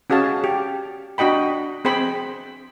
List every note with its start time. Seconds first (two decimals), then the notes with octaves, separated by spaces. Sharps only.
0.10 C#4 F#4 G#4 F5 A5
0.44 G4
1.18 D4 F#4 D#5 G5 B5
1.85 C4 G#4 C5 G5 B5